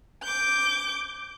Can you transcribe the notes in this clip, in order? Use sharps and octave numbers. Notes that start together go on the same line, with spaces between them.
D6 G6